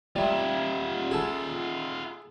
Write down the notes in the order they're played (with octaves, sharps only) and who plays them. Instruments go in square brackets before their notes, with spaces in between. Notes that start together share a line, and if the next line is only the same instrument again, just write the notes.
[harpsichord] G3 [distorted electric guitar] F4 E5
[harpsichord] G#4 A4